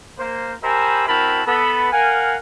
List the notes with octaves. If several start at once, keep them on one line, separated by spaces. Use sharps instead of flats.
A#3 C5
G4 A#4 C5 E5 G#5 B5
C4 E4 F#4 A#4 A5 B5
B3 A4 B5
A#4 F5 F#5 G#5